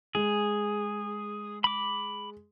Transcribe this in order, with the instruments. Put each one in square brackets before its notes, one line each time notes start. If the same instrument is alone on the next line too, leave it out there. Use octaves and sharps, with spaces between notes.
[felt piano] G#3 [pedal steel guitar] G#4
[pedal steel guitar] B5 D6